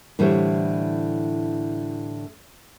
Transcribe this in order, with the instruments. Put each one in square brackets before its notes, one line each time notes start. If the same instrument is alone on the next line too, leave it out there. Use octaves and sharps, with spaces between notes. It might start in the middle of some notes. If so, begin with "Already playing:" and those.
[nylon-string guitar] A2 D3 E3 G3 C5 C#5